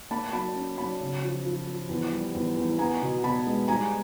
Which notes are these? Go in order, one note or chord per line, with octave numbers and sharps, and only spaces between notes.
A#3 A5 B5
F#3 A5 B5
C#4
F#3 A5 B5
C#3
F3
F3
F3
E2
G3
E2
E2
B3 G#5 A#5
B2
B2 A5 B5
G#3
G3 G#5 A#5